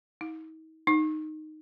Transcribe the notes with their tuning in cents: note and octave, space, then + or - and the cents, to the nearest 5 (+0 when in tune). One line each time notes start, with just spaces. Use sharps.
D#4 +45
D#4 -5